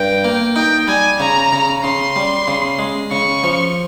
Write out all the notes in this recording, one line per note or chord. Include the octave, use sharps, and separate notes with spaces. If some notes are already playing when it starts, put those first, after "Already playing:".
Already playing: G2 G5
A#3
D#4 G5
G3 G#5
C#3 A#5
C#3
C#3 C6
G3
C#3
G#3
C#3 C#6
F3